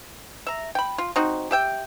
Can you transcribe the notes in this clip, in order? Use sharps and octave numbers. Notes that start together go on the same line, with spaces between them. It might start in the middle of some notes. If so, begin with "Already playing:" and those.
E5 A#5
G5 B5
F4
C4 D#4 F#4
G4 E5 G5